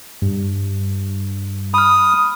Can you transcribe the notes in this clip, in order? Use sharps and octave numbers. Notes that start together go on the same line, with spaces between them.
G2
B5 D#6 F6